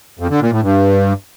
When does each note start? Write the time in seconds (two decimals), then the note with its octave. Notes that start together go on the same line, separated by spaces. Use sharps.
0.19 F2
0.30 D3
0.41 A#2
0.52 A2
0.62 G2